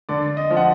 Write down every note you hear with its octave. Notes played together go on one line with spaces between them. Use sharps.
D3 D5
D#5
F3
F#5